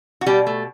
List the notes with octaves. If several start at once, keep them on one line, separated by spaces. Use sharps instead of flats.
F#4
B2 G3 G4
A3